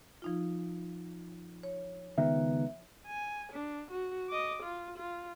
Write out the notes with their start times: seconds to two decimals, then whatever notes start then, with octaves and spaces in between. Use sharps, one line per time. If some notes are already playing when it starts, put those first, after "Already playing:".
0.22 F3 D#4 F4
1.63 C#5
2.18 C#2 D#3 B3 E5
3.07 G#5
3.52 D4
3.91 F#4
4.29 D#5 D6
4.63 F4
4.98 F4